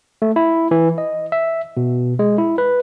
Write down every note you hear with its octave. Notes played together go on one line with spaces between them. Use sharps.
A3
E4
E3
D#5
E5
B2
G#3
E4
B4